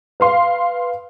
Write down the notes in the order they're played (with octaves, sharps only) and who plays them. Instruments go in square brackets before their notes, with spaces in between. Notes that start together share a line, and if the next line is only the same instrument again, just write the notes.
[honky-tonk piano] B4 F5 C6